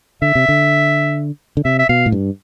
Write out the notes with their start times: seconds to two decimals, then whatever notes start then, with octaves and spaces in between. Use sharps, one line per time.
0.22 D3 E5
0.35 C3
0.49 D3
1.57 D3
1.65 C3 E5
1.79 E5
1.89 B2 F5
2.06 A2
2.12 G2